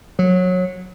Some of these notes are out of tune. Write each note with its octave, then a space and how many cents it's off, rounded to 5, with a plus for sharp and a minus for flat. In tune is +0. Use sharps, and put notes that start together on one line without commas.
F#3 -20